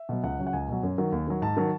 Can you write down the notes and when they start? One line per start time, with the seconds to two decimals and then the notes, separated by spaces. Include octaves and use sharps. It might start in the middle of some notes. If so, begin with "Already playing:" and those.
Already playing: E5
0.09 B2 F#3
0.23 C#2 F#5
0.38 C#3 F#3
0.47 F#5
0.53 C#2 G#5
0.68 B2 F#3
0.83 F#2
0.98 D#3 F#3
1.12 D#2
1.27 D#3 F#3
1.42 G#2 A5
1.57 D#3 F#3